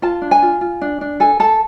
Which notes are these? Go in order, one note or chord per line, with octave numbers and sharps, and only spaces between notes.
F4 A5
D4
G#5
F4
F4
D4
D4
A4 G#5
A4 A5